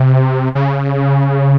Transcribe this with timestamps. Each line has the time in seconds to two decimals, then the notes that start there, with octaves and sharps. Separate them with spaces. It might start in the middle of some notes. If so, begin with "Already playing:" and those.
Already playing: C3
0.55 C#3